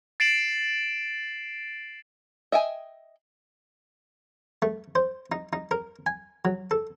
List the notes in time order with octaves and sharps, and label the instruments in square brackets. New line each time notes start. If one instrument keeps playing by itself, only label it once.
[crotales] A6 C7 D7 E7 F#7
[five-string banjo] D#5 E5 G5 G#5
[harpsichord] A3
C5
D#4
D#4
A#4
G#5
F#3
A4